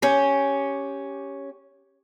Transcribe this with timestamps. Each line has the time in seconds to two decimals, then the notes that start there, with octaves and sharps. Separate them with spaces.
0.02 C#4 G4